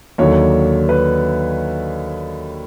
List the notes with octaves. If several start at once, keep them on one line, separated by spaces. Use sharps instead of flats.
D#2 D3 F#3 C#5
B4